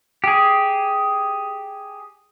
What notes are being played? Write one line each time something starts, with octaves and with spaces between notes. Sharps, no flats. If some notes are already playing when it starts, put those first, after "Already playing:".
G4 G#4